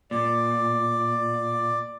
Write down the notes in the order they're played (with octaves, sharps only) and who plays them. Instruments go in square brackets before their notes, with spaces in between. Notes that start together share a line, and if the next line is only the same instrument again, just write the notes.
[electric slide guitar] A#2 [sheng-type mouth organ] D5